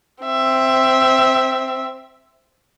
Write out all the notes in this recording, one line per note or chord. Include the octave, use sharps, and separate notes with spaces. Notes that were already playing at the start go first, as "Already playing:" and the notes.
C4 E5